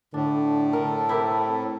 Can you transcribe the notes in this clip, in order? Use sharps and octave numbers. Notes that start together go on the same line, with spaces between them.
A2 D3 D4
A4 A#4
C4 E4 G4 A#4